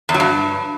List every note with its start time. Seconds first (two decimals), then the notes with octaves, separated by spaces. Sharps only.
0.09 E2
0.14 F#3
0.20 G2